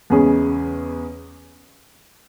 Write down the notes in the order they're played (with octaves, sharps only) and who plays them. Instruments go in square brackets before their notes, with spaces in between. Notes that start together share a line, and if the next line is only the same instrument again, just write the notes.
[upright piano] E2 C#3 G#3 C#4 G#4